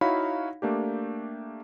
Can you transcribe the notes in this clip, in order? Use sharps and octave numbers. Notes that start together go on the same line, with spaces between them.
D#4 E4 F#4 C#5 F5 B5
A3 A#3 D4 G4